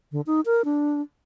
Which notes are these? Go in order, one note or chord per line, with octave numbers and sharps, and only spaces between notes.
D3
D#4
A#4
D4